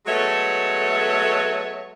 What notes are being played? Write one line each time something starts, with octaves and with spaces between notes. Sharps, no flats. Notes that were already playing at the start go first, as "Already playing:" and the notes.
F#3 G#3 A3 B3 C#5